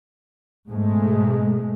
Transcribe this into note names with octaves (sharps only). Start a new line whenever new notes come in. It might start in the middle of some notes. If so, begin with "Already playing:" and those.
G#2 B2 G#3 A3